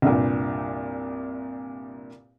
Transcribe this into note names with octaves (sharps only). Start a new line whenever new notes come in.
C2 G2 A#2